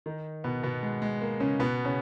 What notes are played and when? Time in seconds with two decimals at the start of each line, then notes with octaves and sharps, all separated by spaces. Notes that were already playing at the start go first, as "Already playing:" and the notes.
0.06 D#3 D#4
0.44 B2 B3
0.63 B2 B3
0.83 G#3
1.02 G#3
1.21 A#3
1.40 C#3 C#4
1.59 B2 B3
1.85 C#3 C#4